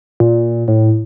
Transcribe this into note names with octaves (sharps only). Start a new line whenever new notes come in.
A#2
A2